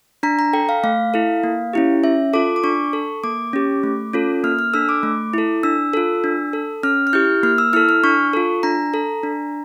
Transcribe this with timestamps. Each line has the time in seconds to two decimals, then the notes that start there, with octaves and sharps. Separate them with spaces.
0.23 D4 A#5
0.39 A#5
0.53 A4 G5
0.69 F5
0.84 A3 F5
1.14 E4 A4
1.44 A#3
1.73 C#4 E4 G4
2.04 C#4 E5
2.33 F4 A4 D6
2.56 D6
2.64 D4 C#6
2.93 A4
3.24 A#3 D6
3.53 C#4 G4
3.83 A3
4.13 C#4 F4 A4
4.44 A#3 F6
4.59 F6
4.74 D4 A4 E6
4.89 D6
5.03 A3
5.33 E4 A4
5.63 D4 E6
5.93 F4 A4
6.24 D4
6.53 A4
6.83 C#4 F6
7.07 F6
7.13 E4 G4 G6
7.43 A#3 F6
7.58 E6
7.73 E4 A4 F6
7.89 F6
8.03 D4 C#6
8.33 F4 A4
8.63 D4 A#5
8.94 A4
9.23 D4